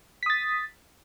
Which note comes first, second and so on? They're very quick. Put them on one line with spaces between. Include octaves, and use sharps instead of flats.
B6 D#6 A6